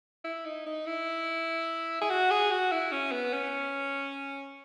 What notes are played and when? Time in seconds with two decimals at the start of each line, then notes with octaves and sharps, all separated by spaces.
0.25 E4
0.45 D#4
0.66 D#4
0.86 E4
2.02 G#4
2.10 F#4
2.31 G#4
2.51 F#4
2.72 E4
2.92 C#4
3.12 B3
3.33 C#4